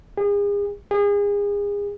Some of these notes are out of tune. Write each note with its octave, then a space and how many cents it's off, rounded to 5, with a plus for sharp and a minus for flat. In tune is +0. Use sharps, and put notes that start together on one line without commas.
G#4 -40
G#4 -35